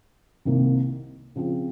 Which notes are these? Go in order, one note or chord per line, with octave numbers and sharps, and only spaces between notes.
C2 C3 D#3 A#3
C#3 F3 C4